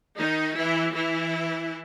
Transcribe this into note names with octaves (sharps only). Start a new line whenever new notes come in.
D#3 D#4
E3 E4
E3 E4